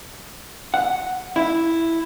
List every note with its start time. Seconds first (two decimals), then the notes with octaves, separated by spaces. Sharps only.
0.74 F#5
1.36 E4